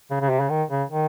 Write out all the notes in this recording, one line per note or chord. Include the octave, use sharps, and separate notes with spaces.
C#3
C#3
C3
C#3
D#3
C#3
D#3